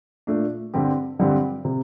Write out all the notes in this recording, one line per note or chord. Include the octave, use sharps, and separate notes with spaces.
A#2 A3 D4
G2 D3 G3 C4 G4
G2 D3 G3 C4 G4
C3